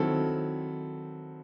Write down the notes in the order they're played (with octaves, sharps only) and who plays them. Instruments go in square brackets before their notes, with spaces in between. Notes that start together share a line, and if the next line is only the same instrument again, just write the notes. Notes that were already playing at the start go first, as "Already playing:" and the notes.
Already playing: [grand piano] D#3 F#3 C4 E4 A4